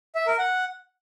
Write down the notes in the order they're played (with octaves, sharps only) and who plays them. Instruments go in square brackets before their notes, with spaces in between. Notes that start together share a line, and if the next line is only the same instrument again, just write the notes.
[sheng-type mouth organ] E5
A#4
F#5